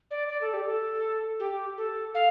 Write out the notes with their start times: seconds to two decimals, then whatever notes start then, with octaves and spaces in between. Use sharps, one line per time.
0.11 D5
0.29 D5
0.41 A4
0.53 G4
0.66 A4
1.40 G4
1.78 A4
2.15 F5